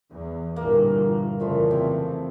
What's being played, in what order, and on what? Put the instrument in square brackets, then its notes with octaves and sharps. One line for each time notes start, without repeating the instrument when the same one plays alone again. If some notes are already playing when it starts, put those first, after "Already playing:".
[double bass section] E2
[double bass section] G1 A#2 E3 [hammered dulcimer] A#3
[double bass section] F2 C#3 E3 [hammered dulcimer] A#2 F3 A3
[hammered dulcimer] C3